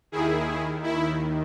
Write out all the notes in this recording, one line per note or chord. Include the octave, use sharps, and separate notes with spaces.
D#2 D#3 E4 G#4
E4